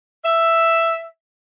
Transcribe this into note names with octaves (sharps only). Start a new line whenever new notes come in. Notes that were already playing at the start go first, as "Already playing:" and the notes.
E5